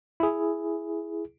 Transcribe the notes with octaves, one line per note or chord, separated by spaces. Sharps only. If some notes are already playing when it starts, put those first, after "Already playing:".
E4 G#4